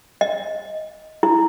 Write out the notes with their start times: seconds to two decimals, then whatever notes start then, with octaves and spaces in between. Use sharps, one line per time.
0.21 D#5
1.23 E4